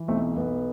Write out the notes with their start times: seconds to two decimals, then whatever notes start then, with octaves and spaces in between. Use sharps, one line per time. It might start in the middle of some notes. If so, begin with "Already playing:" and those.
Already playing: E3
0.08 B1 A3 C4
0.36 B1 B3